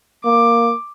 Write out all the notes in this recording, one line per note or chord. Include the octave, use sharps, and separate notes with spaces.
A#3 D6